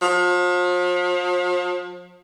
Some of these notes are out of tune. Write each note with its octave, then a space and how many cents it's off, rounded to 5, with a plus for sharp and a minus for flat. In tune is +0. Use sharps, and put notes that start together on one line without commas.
F3 +40